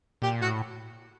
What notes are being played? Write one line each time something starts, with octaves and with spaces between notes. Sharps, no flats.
A#2 G4
A2 F#4